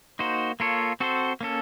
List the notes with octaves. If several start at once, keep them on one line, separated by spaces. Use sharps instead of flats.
A#3 D#4 F#4 C5
A#3 F4 A4 C#5
C4 F#4 A4 C5
A#3 C#4 A4